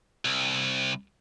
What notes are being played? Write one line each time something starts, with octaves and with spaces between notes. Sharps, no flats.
C2